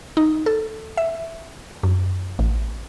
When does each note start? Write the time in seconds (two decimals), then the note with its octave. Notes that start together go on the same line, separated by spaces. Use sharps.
0.17 D#4
0.46 A4
0.97 E5
1.83 F#2
2.39 A1